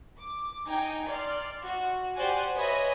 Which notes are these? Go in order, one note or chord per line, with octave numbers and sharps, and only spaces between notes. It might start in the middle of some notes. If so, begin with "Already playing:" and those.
D6
D#4 G5 G#5
D5 C6 F6
F#4
G4 C5 D5 F#5 G#5
B4 C#5 D#5 E5 G#5 B5